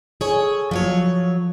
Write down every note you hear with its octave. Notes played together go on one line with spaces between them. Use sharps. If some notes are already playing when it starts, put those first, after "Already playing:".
G#4 A4 C#5
F3 F#3 C#5